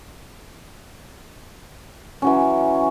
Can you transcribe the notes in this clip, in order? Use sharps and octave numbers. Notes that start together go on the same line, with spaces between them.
E3 F#3 C#4